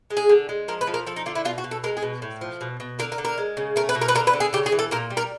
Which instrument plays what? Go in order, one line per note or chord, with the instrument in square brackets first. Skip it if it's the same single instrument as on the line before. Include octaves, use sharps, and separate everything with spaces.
[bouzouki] G#3
G#4
D3
G#3
F3 A#4
B4
F3
A#4
F3 A4
D#4
D3 F4
E4
B2 F4
F#4
B2
A4
G#3 A#4
G#4
B2
A2
F3
B2
B2
D3 A#4
A#4
D3
A#4
G#3
C#3
A3 A#4
B4
B2
A#4
B4
D3 A#4
B4
D3
G#4
C#3 G4
G#4
E3
A4
A#2 A#4
G3
A#4